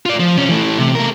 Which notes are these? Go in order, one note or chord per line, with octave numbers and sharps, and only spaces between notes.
F4 D5
F3
C3 C#4
E3 A3
C3
A3 A#4